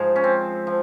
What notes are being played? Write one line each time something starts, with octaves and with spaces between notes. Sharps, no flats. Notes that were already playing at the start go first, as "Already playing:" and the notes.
Already playing: G#2 F3 G#4
C#4
C4
F3